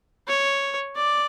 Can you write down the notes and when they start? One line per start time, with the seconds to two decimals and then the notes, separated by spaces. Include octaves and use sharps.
0.28 C#5
0.96 D5